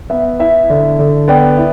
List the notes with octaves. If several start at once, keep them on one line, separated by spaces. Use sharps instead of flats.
B3 E5
E4 E5
D3
D3
B3 D5 G5
E4